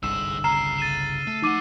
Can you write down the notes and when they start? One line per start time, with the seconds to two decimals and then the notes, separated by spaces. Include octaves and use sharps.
0.03 G1 C2 D3 D#4 G#4 E6 E7
0.44 C#3 A#5 F6 C7 E7
0.78 A6 D#7 E7
1.27 A3 A4
1.42 F2 D#4 F#5 D6 D#7